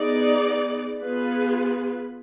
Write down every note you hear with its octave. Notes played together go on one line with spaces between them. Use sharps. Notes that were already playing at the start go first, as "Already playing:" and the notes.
Already playing: B3 D#4 G#4 D5
B3 F4 G#4 B4